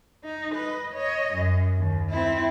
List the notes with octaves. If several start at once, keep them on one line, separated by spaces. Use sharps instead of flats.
D#4
B4 D#5
C#5 D#5
F#2
D#2
C4 E4